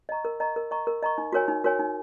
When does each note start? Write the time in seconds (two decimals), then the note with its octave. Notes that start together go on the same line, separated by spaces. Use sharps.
0.09 D#5 A#5 C#6
0.25 A#4
0.40 D#5 A#5 C#6
0.56 A#4
0.71 D#5 A#5 C#6
0.87 A#4
1.03 D#5 A#5 C#6
1.18 D#4
1.33 F#4 A#4 C#5 G#5
1.48 D#4
1.64 F#4 A#4 C#5 G#5
1.79 D#4